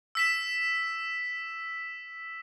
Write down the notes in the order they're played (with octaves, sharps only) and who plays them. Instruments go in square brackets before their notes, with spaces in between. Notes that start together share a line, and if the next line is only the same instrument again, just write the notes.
[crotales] E6 B6 E7